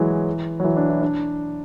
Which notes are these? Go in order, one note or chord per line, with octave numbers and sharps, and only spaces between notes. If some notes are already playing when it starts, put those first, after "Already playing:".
Already playing: E3 F#3 G#3
F#3
E3
D4
E4
D4